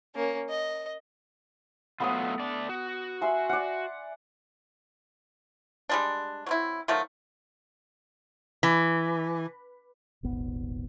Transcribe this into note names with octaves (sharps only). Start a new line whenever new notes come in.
A#3 C#4
D#5
F#3 A3 B3 F4 D#6
A3 D5
F#4
E5 G#5 C6
D5 F#5
G3 G#3 D4
F#3 C4 E4
D#3 F3 F#3 A3
E3
D#1 G#1 B3